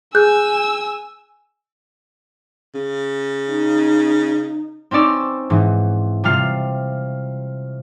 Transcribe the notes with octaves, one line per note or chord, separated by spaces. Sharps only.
G#4 G#5 E6 F#6 G6
C#3
D#4
C4 C#4 D#4 D5 E6
G#2 E3
C3 G3 F4 F6 C7